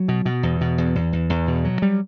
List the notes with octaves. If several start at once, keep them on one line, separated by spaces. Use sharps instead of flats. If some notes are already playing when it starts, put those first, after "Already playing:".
Already playing: F#3
B2
B2
E2
B2
E2
E2
E2
E2
B2
F#3
G3